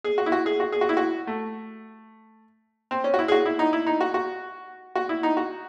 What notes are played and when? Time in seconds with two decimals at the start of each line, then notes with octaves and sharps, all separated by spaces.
0.04 G#4
0.18 F#4
0.26 E4
0.32 F#4
0.46 G#4
0.60 F#4
0.72 G#4
0.81 F#4
0.89 E4
0.97 F#4
1.27 A3
2.91 C4
3.04 C#4
3.14 F#4
3.19 E4
3.28 G#4
3.32 F#4
3.46 E4
3.59 D#4
3.73 E4
3.87 D#4
4.01 F#4
4.14 F#4
4.96 F#4
5.09 E4
5.23 D#4
5.37 F#4